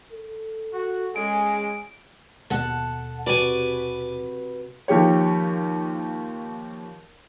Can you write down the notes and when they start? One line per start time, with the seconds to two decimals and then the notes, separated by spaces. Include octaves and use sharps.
0.12 A4
0.74 F#4
1.16 G#3 C#4 G#4 D7
2.50 D#2 B2 A4 F#5
3.27 C3 F#4 B4 D5 G#5
4.88 D#2 F3 G4 C#5